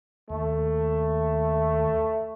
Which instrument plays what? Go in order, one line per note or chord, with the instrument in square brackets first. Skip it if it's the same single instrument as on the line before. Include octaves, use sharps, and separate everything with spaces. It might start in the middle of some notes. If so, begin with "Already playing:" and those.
[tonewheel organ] D#2 [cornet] A3